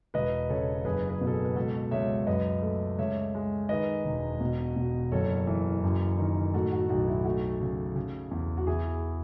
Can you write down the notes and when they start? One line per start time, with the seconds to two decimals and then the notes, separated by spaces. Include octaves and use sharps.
0.14 E1 B4 D#5
0.50 C#3 A4 C#5
0.85 F#1 G#4 B4
1.09 G#4 B4
1.21 B2
1.27 A4
1.33 G#4 B4
1.45 B4
1.56 C#2 F#4 A4
1.91 C#2 C#5 E5
2.27 F#2 B4 D#5
2.62 A3
2.98 C#2 C#5 E5
3.35 G#3
3.69 D#3 B4 D#5
4.05 E1
4.41 B2
4.76 B2
5.12 F#1 A4 C#5
5.47 E3
5.84 F#2
6.19 D#3
6.53 A2 F#4 A4
6.72 F#4
6.90 B1 F#4
7.08 E4
7.25 A3 F#4
7.61 C#3
7.96 C#3
8.31 E2
8.57 F#4
8.67 E2 E4 G#4